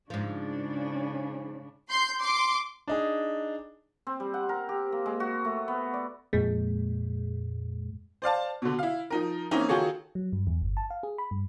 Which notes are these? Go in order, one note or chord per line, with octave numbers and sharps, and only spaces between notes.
G#2 C#3 F3 D4
C6 G6
C6 D6
D4 D#4 G#4
C4
G3
F#5
A#4
G4
A#3
G#3
F#4
A3
B3
D5
F2 A#2 G#3
C5 D5 F5 A5
B2 D3
E4 F5
F3 D#4 A#4
E3 A#3 C4 C#4 D#4 E4
D#3 F4 F#4 G#4 A4 C#5
F#3
G2
E2
G1
A5
F5
G#4
B5
G2